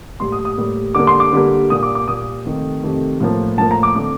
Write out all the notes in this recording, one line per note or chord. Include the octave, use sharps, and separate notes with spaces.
A2 G3 A#3 C6
D#6
D#6
A2 G3 A#3
D3 G3 A#3 D6
C6
D6
D3 G3 A#3
A#2 G3 A#3 D#6
D6
D6
A#2 G3 A#3 D#6
F2 C3 D#3 A3
F2 C3 D#3 A3
A2 F3 A#3
A2 F3 A#3 A5
A#5
D6
D3 A3 C4 D6